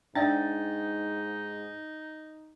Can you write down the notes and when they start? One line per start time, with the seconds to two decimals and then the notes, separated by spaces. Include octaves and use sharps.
0.15 G#2 D4 D#4 D5 E5 G5 A6